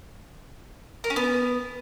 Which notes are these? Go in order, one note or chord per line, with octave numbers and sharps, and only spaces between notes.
A#4
C#4
B3